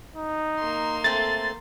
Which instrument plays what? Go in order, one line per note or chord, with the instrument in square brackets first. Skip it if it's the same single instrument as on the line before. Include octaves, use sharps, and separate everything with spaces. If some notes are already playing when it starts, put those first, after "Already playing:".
[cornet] D#4
[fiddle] A#3 C6
[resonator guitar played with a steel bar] A3 C4 [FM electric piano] A6